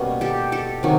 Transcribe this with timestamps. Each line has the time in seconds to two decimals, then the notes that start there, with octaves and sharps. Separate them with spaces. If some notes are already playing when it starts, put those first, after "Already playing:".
Already playing: B2 G3 A#3 C#4
0.21 G4 A4
0.52 G4 A4
0.83 C3 D#3 F#3